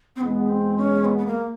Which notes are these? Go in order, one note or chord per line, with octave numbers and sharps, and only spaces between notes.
C4
E2 B2 G#3 B3
C4
C#4
B3
B3
A#3